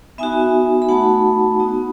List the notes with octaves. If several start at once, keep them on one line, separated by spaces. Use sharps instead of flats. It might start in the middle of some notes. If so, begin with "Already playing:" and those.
B3 D#4 F#4 E5 G#5
B5
A3 D#4 F#4 F#5 A5
B3 D#4 F#4